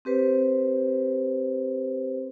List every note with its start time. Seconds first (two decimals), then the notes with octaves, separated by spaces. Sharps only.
0.05 C4 G4 B4 C5